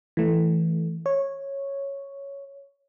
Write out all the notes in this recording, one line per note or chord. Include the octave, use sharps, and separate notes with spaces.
E3 A3
C#5